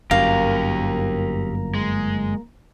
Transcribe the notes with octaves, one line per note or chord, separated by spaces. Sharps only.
G1 F#2 A#3 G4 A#4 F5 A#5
G#3